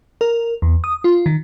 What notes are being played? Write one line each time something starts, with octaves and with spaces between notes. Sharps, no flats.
A#4
E2
D#6
F4
D#3